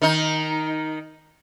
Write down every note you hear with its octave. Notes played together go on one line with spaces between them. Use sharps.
D#3 D#4